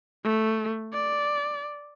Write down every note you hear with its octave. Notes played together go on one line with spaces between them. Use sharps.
A3
D5